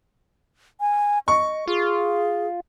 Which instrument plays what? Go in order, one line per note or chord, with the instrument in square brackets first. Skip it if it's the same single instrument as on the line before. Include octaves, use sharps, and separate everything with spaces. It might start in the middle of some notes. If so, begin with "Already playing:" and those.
[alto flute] G#5
[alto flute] D#5 [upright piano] C#6
[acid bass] F4 [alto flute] G#4